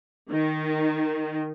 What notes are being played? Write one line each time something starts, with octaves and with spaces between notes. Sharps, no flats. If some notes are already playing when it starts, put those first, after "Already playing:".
D#3